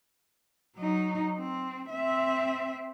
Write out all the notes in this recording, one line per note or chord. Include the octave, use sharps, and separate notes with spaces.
F#3 D#4
C4
C4 E5